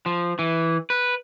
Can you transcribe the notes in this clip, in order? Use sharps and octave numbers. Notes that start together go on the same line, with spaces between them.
F3
E3
B4